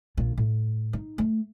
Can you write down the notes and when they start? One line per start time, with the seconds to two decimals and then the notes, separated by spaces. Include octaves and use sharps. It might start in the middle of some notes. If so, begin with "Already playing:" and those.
0.17 A#1 F4
0.38 A2
0.93 D#4
1.18 A3